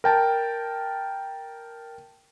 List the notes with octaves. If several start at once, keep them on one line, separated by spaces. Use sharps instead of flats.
A#4 G5 A5